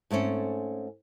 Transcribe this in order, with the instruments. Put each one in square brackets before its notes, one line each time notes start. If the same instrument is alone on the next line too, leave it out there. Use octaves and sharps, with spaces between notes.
[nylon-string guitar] G#2 A3 C4 C#4